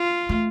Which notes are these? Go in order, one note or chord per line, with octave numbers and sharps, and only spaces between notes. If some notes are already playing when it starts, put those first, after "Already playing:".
Already playing: F4
A3